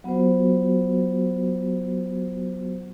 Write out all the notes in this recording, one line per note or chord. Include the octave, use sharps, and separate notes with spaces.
F#3 B3 F4 F#4 C5